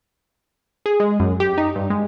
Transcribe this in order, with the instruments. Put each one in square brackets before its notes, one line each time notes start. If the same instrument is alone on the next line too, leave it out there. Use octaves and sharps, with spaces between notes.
[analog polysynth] G#4
G#3
F#2
G4
D#4
G2
G#3